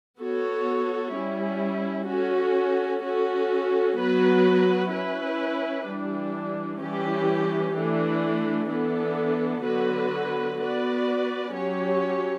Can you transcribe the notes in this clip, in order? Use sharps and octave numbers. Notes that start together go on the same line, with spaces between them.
B3 F#4 A4 C#5
G3 C#4 E4
C#4 F#4 A4
C#4 F#4 A4
F#3 B3 F#4 B4
C#4 E4 B4
E3 G3 D4
E3 G3 C#4 G4
E3 A3 D4
E3 B3 D4 A4
D3 F#3 B3 F#4 B4
B3 F#4 B4 D5
F#3 C#4 G4 C#5